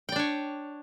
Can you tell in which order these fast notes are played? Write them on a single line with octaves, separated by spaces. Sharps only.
G5 D5 D4 C#5